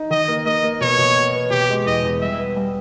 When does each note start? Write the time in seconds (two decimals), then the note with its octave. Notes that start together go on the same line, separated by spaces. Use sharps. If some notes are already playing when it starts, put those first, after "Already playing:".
Already playing: D#4
0.10 D#3 D#5
0.28 A#3
0.45 A#3 D#5
0.63 A#3
0.81 B2 C#5
0.98 B2
1.16 B3
1.34 B3
1.50 B2 G4
1.69 G#3
1.86 E2 D#5
2.03 E2
2.21 G3 E5
2.38 B3
2.56 G3